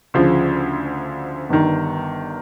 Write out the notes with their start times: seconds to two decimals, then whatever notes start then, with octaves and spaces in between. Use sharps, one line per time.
0.14 D2 C#3 F3
1.49 G1 G2 D#3